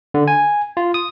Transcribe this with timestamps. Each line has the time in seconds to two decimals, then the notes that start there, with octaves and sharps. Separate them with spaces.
0.14 D3
0.28 G#5
0.77 F4
0.94 D#6